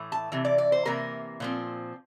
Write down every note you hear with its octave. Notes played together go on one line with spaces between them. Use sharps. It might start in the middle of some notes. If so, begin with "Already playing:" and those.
Already playing: A2 E3 A3
A5
C3 E3
D5
D5
C5
C3 E3 A#3 A#4
A#2 F3 C4